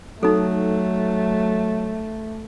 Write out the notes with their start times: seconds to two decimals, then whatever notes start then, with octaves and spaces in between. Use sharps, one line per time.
0.23 F#3 A3 D#4 A4